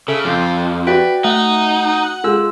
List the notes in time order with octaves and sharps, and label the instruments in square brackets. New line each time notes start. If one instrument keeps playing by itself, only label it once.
[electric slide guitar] C#3 [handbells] A4 [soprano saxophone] E5
[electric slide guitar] F2 [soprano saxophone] F4 [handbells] D6 G6
[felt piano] F#4 [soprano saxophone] B4 [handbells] D5 E5 G5
[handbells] A3 [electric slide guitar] D#4 [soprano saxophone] F#5
[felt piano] G#3 [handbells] F4 E6